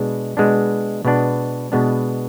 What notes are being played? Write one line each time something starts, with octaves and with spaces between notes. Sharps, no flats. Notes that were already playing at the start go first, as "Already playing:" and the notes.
Already playing: B2 G#3 B3 D4
B2 G#3 B3 D4
B2 G#3 B3 D4
B2 G#3 B3 D4